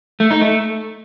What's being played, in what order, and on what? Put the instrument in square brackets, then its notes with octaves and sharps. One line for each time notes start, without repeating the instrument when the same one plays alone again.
[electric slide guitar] A3
D#4
A3